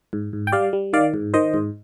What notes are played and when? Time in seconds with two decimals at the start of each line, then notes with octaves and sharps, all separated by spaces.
0.13 G#2
0.33 G#2
0.47 G5
0.52 G3 D5 F5
0.73 G3
0.93 D#3 D5 F5
1.14 G#2
1.34 D#3 C5 D#5
1.54 G#2